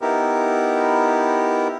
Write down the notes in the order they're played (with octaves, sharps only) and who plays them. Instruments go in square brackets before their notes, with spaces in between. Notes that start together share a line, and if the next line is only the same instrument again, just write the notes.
[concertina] B3 D#4 E4 G4 A#4